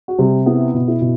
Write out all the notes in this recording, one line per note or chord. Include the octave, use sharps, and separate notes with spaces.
F#4
C3 G3 G4
B3 E4
B2
E4
B2